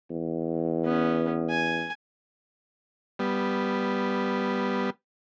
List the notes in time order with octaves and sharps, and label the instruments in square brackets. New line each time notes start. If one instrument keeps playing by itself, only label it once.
[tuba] E2
[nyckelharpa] B3 C#4
G#5
[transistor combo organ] G3 B3